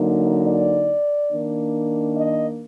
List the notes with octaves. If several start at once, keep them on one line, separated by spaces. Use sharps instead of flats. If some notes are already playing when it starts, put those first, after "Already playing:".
Already playing: D3 F#3 A#3 D#4
D5
D#3 A#3 D4
D#5